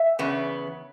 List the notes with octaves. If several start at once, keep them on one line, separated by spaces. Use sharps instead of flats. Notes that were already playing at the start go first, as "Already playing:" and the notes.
Already playing: E5
E2 C#3 B3